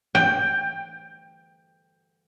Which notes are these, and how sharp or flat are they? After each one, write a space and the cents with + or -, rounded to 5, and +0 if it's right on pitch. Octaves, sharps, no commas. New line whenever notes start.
G5 +10